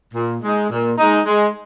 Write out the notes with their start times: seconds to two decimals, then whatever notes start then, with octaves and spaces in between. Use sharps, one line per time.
0.14 A#2
0.42 G#3 D#4
0.70 A#2
0.98 G#3 D#4
1.26 G#3